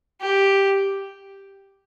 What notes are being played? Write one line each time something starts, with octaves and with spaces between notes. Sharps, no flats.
G4